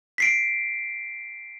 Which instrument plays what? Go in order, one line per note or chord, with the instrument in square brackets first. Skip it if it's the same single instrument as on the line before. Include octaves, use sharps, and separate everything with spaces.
[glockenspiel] B6 C7 D7